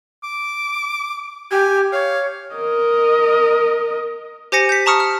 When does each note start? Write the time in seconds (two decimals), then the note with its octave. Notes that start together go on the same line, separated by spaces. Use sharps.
0.23 D6
1.51 G4 G#5
1.92 C#5 F5
2.55 A#4 D#5
4.52 G4 C5 G#5 A#6 C#7
4.69 G6 B6
4.86 A5 A#5 C#6 D#6 F6 C#7
5.00 F6